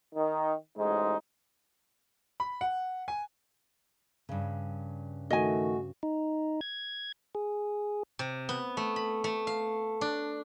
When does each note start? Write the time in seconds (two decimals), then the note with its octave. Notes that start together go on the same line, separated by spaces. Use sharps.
0.14 D#3 D#4
0.77 A1 G#2 G#3 D#4
2.40 B5
2.61 F#5
3.08 G#5
4.29 G2 C#3
5.31 D#3 A3 F#4 D#5 G#5
6.03 D#4
6.61 G#6
7.35 G#4
8.19 C3
8.49 B3
8.77 A3
8.96 B5
9.24 A3
9.47 F5
10.01 D4